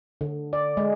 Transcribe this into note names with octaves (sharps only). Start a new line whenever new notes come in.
D3
D5
G#3